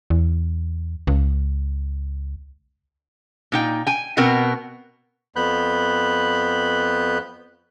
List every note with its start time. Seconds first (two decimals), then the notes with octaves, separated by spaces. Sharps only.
0.10 E2
1.07 C#2
3.52 A#2 D#4 G5
3.87 G5 G#5
4.17 B2 B3 C4 F#4 A#4
5.36 F2 B3 B5 F#6 G6